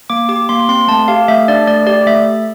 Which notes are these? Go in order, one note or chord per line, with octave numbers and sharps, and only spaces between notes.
A#3 D6
G4 D6
A#3 C6
C4 C6
A3 A5
G4 F5
A3 E5
D4 D5
A3 D5
G4 D5
A3 E5